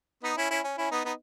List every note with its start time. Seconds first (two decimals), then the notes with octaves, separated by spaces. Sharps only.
0.23 B3 D#4
0.37 C#4 E4
0.51 C#4 E4
0.64 C#4
0.77 C#4 E4
0.91 B3 D#4
1.05 B3 D#4